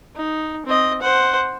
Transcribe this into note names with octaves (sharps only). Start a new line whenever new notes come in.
D#4
C4 D#5
C5 F#5